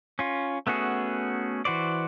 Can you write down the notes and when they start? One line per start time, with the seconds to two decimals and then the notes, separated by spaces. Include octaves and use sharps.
0.19 C#4 F4
0.67 A3 B3 C#4 F#4 G#4
1.65 E3 F#4 C5 D5